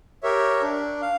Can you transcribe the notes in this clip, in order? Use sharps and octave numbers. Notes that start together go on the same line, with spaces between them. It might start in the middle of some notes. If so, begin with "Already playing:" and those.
G4 A#4 C#5 E5
D4
F5